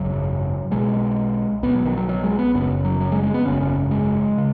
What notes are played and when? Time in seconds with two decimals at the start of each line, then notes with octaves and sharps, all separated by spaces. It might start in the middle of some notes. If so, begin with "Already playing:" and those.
Already playing: G#1 F#2 C#3 F#3
0.71 B1 B2 G#3
1.62 B1 B2 B3
1.74 F#3
1.85 D#3
1.97 F#3
2.09 F#3
2.24 G#3
2.39 B3
2.54 F#1 F#2 C#3 B3
2.85 F#3
3.00 F#3
3.12 G#3
3.23 G#3
3.34 B3
3.45 G#1 F#2 C#3 C#4
3.61 C#4
3.91 G#3
4.38 C#3